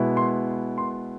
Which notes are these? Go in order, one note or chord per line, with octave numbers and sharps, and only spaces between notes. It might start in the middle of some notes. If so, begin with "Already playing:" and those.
Already playing: B2 G#3 B3 E4
C6
C6